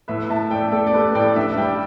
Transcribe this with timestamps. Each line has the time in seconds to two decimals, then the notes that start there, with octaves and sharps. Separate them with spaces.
0.08 A2 B4 E5
0.30 A2 E5 A5
0.51 A3 D5 G5
0.72 A3 A4 D5
0.86 D5
0.93 A3 G4 B4
1.15 A2 D5 G5
1.36 G2 B4 E5
1.52 E5
1.57 G3 D5 G5